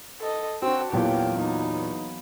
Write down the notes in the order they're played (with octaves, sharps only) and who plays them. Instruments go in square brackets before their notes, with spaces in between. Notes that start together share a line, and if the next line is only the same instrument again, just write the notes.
[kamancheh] A4 D#5
[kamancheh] C4 E6 [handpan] D4 F#4
[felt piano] E2 A#2 [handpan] E3 F#3 A#3 [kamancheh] G4 G5
[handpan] B3 [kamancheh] D#4